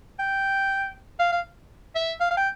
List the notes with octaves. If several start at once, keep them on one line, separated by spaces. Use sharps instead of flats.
G5
F5
F5
E5
F5
F5
G5